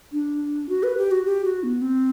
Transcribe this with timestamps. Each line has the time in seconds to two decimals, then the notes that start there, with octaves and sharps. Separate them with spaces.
0.13 D4
0.69 F#4
0.83 B4
0.97 G4
1.11 F#4
1.26 G4
1.45 F#4
1.63 B3
1.82 C4